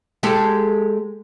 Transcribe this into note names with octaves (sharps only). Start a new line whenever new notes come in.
G#3 G4 A4